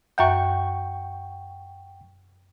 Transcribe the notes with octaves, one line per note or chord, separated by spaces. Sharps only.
F#2 E5 F#5 G5 C#6 G6